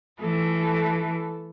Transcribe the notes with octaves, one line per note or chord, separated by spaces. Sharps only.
E3 A3 A4